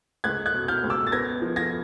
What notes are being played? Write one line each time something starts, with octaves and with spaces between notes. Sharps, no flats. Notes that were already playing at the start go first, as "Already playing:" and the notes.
C#2 F#6 G#6
F#6 G#6
B2
F6 G6
C#2
D6 E6
A6
B3 G#6 A#6
F3
G#6 A#6